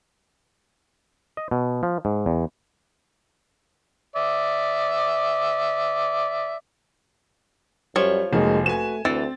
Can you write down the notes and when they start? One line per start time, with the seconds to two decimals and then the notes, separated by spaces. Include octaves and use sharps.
1.37 D#5
1.51 B2
1.83 F3
2.05 G#2
2.26 E2
4.16 D5 E5
7.96 F#2 F3 G3 C#5 D5
8.33 F1 G#3 A#3 D#4 F#4
8.66 A3 F#4 B4 G#5 E7
9.05 D2 E3 C4 A6